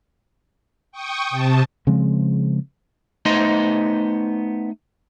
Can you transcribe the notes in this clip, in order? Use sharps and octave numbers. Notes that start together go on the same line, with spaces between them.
G5 C#6 D#6
C3 A5
C#3 F3 G#3 C4
A3 B3 D#4 C5 D#5 C6